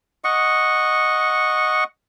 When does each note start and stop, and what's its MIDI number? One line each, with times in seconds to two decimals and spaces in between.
0.24 1.84 75
0.24 1.84 78
0.24 1.84 85